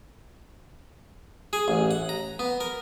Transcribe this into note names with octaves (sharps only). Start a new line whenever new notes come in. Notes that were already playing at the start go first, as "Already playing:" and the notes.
G#4
A1
F#5
A#5
B3
A#4